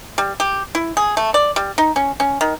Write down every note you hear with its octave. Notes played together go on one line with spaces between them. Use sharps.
G3
G4
E4
G#4
A3
D5
G3
D#4
C#4
C#4
D#3